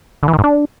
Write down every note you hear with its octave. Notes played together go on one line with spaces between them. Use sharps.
D3
E3
D#3
G#2
D4